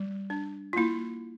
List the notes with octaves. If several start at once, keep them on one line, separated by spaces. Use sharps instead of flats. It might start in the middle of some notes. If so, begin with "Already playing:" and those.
Already playing: G3
D4
F4
A#3 E4